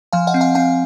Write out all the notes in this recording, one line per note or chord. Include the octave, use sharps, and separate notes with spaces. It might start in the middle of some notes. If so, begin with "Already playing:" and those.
F3 F5 G#5
D#5 F#5
C4
F5 G#5
C4 F5 G#5